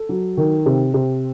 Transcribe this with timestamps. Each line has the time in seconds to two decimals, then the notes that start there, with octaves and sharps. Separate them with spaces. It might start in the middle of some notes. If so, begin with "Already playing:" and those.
Already playing: A4
0.09 F#3
0.37 D#3
0.66 C3
0.94 C3